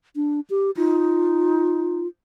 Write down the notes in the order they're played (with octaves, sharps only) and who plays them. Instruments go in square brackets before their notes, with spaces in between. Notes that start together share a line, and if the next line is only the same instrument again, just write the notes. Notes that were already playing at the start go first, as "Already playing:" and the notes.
[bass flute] D4
G4
[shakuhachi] D#4 [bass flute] F4